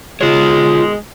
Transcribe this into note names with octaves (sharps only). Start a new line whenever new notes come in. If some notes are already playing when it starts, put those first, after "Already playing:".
B2 D#3 G#3 F4 C#5